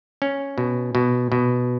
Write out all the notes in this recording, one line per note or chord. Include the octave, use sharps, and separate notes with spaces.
C#4
B2
B2
B2